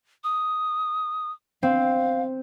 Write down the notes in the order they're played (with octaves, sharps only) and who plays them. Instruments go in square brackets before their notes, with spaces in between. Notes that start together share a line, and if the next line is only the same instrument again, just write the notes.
[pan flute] D#6
[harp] C4 [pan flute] F5